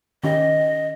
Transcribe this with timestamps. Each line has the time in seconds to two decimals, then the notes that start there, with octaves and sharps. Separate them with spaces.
0.24 D#3 C#4 G4 D#5